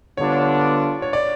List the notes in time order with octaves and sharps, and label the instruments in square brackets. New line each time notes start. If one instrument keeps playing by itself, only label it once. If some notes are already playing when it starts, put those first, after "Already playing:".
[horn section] D3 G3 B3 D4 F4 [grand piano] C#5
[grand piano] C#5
D5